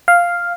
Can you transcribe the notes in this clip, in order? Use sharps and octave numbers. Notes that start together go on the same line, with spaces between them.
F5